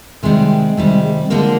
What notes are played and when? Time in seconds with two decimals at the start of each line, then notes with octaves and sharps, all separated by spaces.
0.23 C3 D#3 G3 G#3
0.77 C3 D#3 G3
1.30 D3 F3 G#3 A#3